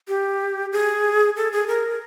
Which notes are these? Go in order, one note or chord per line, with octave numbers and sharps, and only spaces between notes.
G4
G#4
A4
G#4
A#4